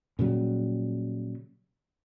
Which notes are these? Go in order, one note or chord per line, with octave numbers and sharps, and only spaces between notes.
A#2 C#3 F#3 G3